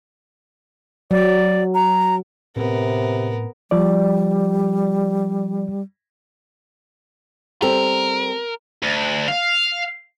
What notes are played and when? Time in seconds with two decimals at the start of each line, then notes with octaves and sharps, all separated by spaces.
1.11 F#3 D5
1.75 A#5
2.56 A2 C3 B3 C4 A#4
3.71 F3 G3 D5
7.62 G3 C4 A4 A#4
8.83 D2
9.28 F5